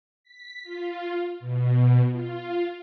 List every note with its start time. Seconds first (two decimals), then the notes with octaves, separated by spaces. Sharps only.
0.23 B6
0.63 F4
1.40 B2
2.12 F4